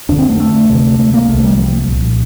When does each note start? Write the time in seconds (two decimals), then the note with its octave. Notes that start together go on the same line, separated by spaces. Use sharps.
0.09 F2 D3 D4
0.19 C4
0.29 A3
0.40 A3
0.69 D2 C3
0.99 A3
1.14 A#3
1.28 C2 C3 A3
1.44 G3
1.58 F3
1.88 C2 A#2